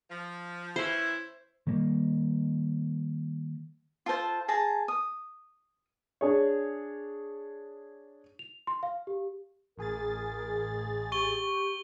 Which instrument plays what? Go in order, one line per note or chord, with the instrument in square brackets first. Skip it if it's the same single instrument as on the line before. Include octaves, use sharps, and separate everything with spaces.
[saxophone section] F3
[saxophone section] E3 C#4 E4 [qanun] C5
[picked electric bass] D#3 G3 A#3
[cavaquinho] F4 A4 C5 A5
G#4 A5 A#5
D#6
[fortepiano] D4 G#4 C#5
[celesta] F7
C6
F5
G4
[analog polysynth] A1 G#4 A6 [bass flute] A#4
[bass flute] G4 [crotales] C#6 G7